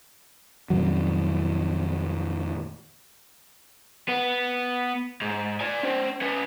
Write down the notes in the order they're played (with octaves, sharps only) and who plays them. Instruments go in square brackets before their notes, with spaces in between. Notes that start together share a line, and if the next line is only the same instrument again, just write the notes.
[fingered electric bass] F2 A#2 D#3 F#3
[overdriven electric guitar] B3
G#2
D5 G#5
C#4 C5
C#4 B4